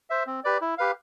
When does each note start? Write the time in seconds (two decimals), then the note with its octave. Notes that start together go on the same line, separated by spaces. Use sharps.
0.10 C5 E5
0.27 C4
0.44 G4 B4 D5
0.61 E4
0.78 G4 B4 F5